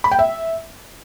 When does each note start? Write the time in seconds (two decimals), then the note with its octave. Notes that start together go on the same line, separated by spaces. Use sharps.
0.04 B5
0.11 G5
0.19 E5